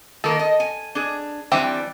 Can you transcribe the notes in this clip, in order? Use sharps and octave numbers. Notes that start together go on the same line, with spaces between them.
D#3 A#3 A4 A#4
D#5
G#5
D4 G#4
E3 G3 C4 D4 G4 E5